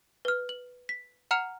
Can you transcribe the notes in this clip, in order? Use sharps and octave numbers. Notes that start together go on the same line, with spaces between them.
B4 F6
F#7
B6
F#5 A#5 F6 C#7 F7